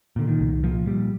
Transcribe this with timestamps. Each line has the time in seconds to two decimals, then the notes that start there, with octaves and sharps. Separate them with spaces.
0.16 A#2 D3
0.28 D#3
0.40 C2
0.63 A#2 F3
0.87 A#2 G3